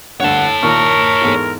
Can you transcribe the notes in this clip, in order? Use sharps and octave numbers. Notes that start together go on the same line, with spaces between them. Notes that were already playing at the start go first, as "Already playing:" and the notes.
D2 G2 A4 C#5 F#5 A5
D#2 A#2 A#4 C#6 F6
E2 G#2 A4